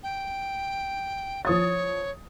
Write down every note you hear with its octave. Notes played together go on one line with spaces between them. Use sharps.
G5
F3 C#5 D#6 A6